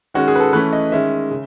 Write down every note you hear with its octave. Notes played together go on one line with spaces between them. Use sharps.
D#3 G#3 C#4 F#4
G#4
B4
A4
E3 A3 C#4 B4
D#5
D#3 G#3 C#4 E5
C#3